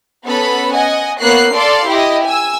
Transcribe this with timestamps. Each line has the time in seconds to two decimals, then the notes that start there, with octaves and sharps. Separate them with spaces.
0.25 B3 C#4 A4 B4 B5
0.73 D#5 F#5 G#5
1.20 A#3 B3 C#5 F#6 C7
1.55 A4 D5 F5 C6
1.88 E4 G4 D#5
2.26 G#5 E6